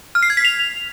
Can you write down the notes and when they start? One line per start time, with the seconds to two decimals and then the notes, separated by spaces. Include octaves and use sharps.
0.15 F6
0.22 C7
0.30 G#6
0.37 B6
0.45 F7